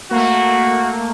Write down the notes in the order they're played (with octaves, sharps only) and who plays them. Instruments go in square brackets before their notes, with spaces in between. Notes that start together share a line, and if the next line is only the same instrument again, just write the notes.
[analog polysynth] A3 A#3 [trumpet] F#4